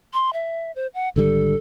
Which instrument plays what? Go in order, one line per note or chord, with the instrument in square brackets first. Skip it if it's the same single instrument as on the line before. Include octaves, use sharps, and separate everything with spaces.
[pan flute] C6
E5
C5
F#5
[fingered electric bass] G#1 D3 G3 [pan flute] A4